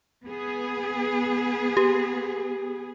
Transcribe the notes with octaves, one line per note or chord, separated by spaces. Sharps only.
B3 G#4
G4